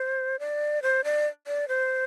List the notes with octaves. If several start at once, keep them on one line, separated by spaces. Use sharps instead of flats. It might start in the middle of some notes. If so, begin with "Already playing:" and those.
Already playing: C5
D5
C5
D5
D5
C5